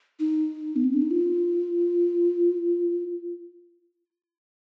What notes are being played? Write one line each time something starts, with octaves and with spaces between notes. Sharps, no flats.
D#4
B3
C4
D4
D#4
F4